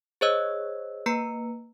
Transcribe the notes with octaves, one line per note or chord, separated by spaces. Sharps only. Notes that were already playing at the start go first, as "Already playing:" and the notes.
G#4 C5 C#5 D#5 E6
A#3 B4 A#5 C#7